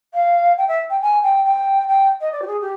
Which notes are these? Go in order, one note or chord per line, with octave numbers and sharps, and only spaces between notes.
F5
G5
E5
G5
G#5
G5
G5
G5
D#5
D5
G4
G#4
G4